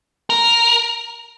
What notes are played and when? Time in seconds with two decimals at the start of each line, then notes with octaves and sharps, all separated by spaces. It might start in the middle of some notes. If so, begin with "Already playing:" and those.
0.30 A#4